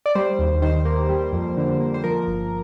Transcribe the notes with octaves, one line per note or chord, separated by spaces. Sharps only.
D5
G3 C5
D#2
D#3 C5
A#3
G3
F2
D3
A#3
C5
F3 A#4
G1